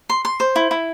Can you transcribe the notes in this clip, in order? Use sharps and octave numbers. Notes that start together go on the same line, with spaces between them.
C6
C6
C5
E4
E4